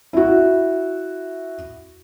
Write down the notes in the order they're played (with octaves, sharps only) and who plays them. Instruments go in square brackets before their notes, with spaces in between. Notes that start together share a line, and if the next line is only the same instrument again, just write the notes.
[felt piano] E4 F#4